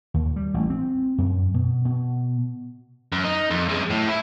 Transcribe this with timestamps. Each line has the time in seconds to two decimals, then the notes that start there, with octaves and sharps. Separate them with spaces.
0.14 D#2
0.36 G3
0.54 A1
0.70 C4
1.18 F#2
1.54 B2
1.85 B2
3.12 F#2
3.25 D#4
3.50 F2
3.69 F#2 G#3
3.90 A2
4.09 E4